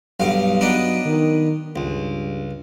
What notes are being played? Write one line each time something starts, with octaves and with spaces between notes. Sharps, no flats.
B1 G2 F5
F#3 B3 D4 D#4
D#3
C#2 G2